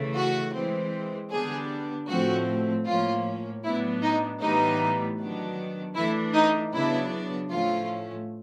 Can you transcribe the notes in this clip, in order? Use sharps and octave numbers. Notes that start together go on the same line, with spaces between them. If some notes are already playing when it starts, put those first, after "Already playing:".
Already playing: C#3 E3 A3
F#4
E3 G#3 C4
D3 G3 B3 D4 G#4
A2 F3 A3 C4 F#4
A2 F3 A#3 C#4 F4
A2 F#3 B3 D4 E4
D#4
A2 E3 G3 B3 D#4
D#3 F#3 B3 D4
E3 A3 D4 E4
D#4
C#3 F#3 B3 D4 E4
A2 F3 A3 C#4 F4